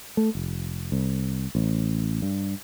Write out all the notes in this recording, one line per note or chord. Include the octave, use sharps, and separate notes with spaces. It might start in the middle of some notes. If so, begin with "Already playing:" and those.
A3
F1
C2
A1
G2